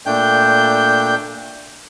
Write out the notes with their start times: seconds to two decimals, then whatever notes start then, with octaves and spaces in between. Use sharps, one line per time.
0.06 A#2 A3 D4 G5 G6